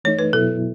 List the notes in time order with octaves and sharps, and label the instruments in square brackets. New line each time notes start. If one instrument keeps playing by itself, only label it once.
[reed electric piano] E3 A3 D#4 [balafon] C#5
[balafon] B4
[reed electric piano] B2 F#3 B3 E4 [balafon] A4